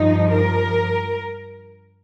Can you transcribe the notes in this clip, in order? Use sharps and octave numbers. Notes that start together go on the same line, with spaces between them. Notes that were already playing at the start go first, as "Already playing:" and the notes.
Already playing: G2 F3 D#4
A#4